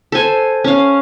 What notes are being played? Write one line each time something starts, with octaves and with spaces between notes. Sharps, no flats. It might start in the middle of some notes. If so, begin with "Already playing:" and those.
A4 C5 G#5
C#4 F5